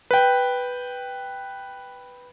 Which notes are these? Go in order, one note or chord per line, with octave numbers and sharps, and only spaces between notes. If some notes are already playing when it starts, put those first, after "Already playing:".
B4 G5